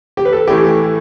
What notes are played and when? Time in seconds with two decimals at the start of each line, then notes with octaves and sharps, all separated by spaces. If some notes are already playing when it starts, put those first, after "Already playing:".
0.17 G4
0.25 B4
0.33 A4
0.48 A2 E3 A3 E4 G4